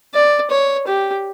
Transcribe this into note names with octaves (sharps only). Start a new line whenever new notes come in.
D5
C#5
G4